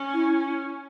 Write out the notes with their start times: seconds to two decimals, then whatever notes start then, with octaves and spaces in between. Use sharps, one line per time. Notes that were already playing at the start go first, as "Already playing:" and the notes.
Already playing: C#4
0.14 E4